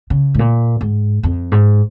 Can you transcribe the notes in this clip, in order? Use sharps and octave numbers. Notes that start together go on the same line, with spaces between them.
C#3
G#2
A#2
G#2
F2
G#2